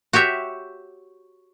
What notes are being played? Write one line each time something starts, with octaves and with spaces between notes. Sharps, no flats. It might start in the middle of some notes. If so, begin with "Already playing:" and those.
F#4 G4 C#5 E5